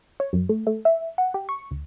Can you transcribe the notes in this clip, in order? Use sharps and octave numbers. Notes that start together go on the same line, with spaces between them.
C#5
F#2
A3
A3
E5
F#5
G4
C#6
D2